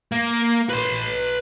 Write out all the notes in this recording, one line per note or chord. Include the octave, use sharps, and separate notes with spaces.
A#3
B4 C6